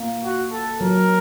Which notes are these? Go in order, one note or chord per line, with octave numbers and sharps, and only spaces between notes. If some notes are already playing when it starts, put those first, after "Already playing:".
Already playing: A#3
F#4
A4
F#3 A#4